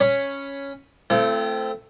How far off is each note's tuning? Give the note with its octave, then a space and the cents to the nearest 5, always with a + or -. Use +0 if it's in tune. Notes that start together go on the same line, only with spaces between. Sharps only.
C#4 +0 C#5 +0 B5 +0
A3 +0 C4 -10 F4 -45